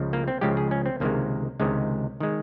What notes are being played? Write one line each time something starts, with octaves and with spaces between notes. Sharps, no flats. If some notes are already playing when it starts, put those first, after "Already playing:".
Already playing: C#2 C#3 F3
A#3
C4
C#2 C#3 F3 G#3 G4
G#4
C#4
C4
C#2 C3 D#3 G#3 A#3
C#2 C3 D#3 G#3
D#3 G#3